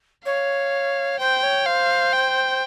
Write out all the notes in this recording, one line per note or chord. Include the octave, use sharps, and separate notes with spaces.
C#5 F5
C5 G5
C#5
C5 F5
G5